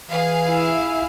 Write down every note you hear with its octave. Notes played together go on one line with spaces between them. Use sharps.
E3 G#4 F5
E4 E5